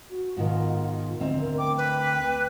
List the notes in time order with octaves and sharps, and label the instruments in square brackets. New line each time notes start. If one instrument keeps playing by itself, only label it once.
[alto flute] F#4
[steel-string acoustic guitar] G#2 B2 D#3 [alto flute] F4
[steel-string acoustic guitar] D2 C4 A#5 [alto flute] D#5
[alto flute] A#4
[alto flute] G5 [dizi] D6
[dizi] B4